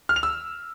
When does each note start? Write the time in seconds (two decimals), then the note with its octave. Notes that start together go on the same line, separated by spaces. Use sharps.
0.09 F6
0.16 F7
0.23 E6